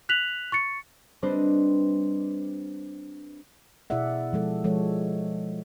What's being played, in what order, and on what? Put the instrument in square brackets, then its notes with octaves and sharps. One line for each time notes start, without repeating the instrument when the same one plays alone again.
[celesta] F#6 B6 F7 F#7
C#6 A6 C#7
[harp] G3 C4 D4 B4 C5 D#5
[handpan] B2 E4 G#4 D5 E5 F#5
F3 G#3 A4
F3 G#3 A4 C#5